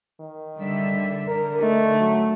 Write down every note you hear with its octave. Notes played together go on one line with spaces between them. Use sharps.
D#3
D3 G3 E5
D3 A#4
A3 D#4
F#3